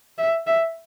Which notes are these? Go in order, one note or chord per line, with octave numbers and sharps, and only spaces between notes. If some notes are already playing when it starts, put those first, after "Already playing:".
E5
E5